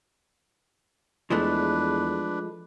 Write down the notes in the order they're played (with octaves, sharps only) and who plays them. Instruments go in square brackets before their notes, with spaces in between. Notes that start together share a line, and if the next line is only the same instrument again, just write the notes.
[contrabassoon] E2 [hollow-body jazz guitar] F3 G#3 A3 [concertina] D4 B4